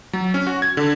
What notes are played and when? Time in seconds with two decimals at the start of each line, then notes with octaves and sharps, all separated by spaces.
0.13 F#3
0.34 C#4
0.47 F#4
0.62 G#6
0.77 D3